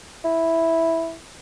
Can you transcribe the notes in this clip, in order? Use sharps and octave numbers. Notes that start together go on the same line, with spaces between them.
E4